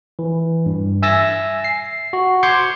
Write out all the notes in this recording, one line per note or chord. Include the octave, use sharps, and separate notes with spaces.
E3
G2
E5 G#5 E6 A6 A#6
C7
F#4
C6 D6 G6 G#6 C7 C#7